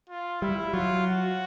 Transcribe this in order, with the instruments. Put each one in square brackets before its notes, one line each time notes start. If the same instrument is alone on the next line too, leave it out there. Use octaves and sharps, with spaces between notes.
[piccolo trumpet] F4
[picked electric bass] G3 [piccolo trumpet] E4
[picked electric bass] F#3 [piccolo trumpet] F4
[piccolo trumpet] F#4